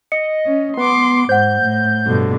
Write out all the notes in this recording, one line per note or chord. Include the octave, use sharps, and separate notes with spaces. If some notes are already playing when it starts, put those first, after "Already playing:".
D#5 C#7
C#4
B3 C6 D6
G#2 C5 F#5 G6
A2
G2 B2 D3